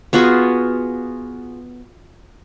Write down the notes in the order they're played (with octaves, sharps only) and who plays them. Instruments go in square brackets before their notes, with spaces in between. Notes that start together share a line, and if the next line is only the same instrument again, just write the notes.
[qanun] B3 F4 F#4 G#4